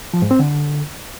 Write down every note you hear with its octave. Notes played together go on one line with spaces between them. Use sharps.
F3
G#2
C4
D3